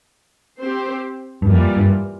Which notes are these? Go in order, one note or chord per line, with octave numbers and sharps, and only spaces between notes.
C4 G4 C5
G2
F2 E3 G3 A#3 F4
G2